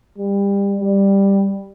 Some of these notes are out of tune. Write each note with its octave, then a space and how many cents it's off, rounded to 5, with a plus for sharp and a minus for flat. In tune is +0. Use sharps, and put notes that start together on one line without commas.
G3 +30
G3 +10